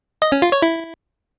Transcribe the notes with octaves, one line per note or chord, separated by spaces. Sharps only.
D#5
C#4
F4
C#5
E4